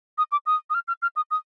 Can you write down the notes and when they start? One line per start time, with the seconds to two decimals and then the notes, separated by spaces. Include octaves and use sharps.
0.18 D#6
0.32 D6
0.46 D#6
0.70 D#6
0.74 F6
0.88 F6
1.02 F6
1.16 D#6
1.31 D#6